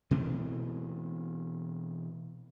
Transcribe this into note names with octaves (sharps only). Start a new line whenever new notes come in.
B2 E3 A3 C4